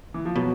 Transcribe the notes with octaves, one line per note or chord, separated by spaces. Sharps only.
E3
F3
B2 F#3